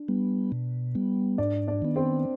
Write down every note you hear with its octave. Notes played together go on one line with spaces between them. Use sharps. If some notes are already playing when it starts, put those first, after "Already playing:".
Already playing: D4
G3 B3
B2
G3 B3
G#2 D4 D5
D4 D5
D#3 B3
C4 C5